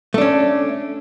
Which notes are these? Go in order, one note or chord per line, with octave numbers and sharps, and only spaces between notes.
A3 C#4 D4